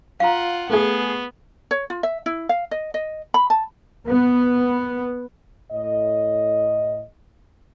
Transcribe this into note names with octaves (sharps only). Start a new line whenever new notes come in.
F4 F5 F#5 A#5
A3 B3 G#4
C#5
F4
E5
E4
F5
D#5
D#5
B5
A5
B3
A2 D#5